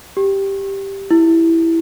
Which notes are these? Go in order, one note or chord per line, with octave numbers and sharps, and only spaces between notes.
G4
E4